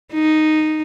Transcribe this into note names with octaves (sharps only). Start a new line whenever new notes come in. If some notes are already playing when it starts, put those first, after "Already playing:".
D#4